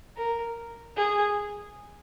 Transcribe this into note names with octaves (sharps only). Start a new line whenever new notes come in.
A#4
G#4